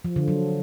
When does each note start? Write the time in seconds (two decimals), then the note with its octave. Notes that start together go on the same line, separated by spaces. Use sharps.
0.04 F3
0.16 D3
0.28 F#3